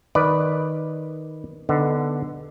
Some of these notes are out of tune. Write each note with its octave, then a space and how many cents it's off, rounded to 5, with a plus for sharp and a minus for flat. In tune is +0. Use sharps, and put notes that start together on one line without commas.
D#3 +5 B4 +0 D5 +0
D3 +0 B3 +0 D#4 +0